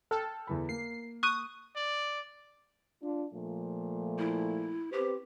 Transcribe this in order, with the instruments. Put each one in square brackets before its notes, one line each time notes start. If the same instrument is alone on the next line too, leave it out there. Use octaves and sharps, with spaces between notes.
[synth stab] A4 [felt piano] G5 E6 F6
[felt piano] E2 E3 B5
[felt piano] A#3 [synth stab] C7
[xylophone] C#6 F#6 D#7 [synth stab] D#6
[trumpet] D5
[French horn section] D4 F4
A#2 F3 A3
[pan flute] E4
[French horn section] C4 B4 C5 [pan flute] G4